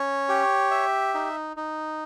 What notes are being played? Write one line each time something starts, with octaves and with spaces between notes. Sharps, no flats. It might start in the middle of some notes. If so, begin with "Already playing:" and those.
Already playing: C#4 C#5
G4
E5
D#4
D#4